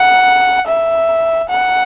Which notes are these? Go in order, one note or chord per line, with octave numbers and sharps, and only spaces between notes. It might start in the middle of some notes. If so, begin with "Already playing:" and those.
Already playing: F#5
E5
F#5